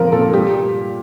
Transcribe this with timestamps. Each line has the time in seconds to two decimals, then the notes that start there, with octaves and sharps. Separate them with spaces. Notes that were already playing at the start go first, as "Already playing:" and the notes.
Already playing: A#2 F3 C4 A#4
0.12 A#2 A4
0.33 G3 G4